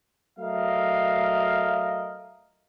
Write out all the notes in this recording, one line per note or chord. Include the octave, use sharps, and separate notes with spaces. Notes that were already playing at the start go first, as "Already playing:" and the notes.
F#3 A3 A#4 D#5 F5